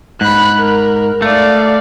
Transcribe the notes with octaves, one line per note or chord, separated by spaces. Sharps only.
G#2 B5 F#6
A#4
A3 D5 F5